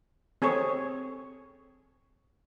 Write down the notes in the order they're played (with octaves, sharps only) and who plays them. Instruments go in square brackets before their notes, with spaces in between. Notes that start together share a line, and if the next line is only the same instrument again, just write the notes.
[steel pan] C4 G#4 A4 C#5